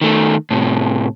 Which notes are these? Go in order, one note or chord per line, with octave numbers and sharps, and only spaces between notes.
D#3 A3
A2 C3